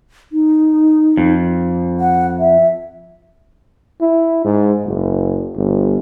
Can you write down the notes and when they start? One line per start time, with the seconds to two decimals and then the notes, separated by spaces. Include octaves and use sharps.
0.32 D#4
1.17 F2
2.00 F#5
2.39 E5
4.01 E4
4.44 G#2
4.85 F#1
5.57 G1